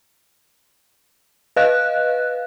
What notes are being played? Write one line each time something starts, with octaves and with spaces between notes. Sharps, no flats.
B4 D#5 F5 F#6